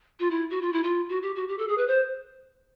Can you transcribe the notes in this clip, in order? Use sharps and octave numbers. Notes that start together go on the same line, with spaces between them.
F4
E4
F#4
F4
E4
F4
F#4
G4
F#4
G4
A4
G#4
B4
C5